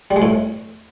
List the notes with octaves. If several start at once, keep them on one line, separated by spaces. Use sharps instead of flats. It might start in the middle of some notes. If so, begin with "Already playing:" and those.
G3
G#3
A2